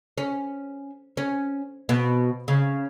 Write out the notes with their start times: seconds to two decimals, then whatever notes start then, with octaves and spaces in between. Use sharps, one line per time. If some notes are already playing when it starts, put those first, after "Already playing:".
0.18 C#4
1.17 C#4
1.89 B2
2.48 C#3